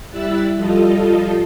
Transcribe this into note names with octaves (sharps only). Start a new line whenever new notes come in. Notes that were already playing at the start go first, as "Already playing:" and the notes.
G3 E4 E5 E6 F#6 A6
F3 G3 F4 A4 D#5